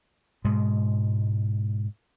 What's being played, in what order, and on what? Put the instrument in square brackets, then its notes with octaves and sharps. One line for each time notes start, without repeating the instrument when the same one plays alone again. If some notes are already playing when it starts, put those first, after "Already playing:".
[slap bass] G#2 B2 G#3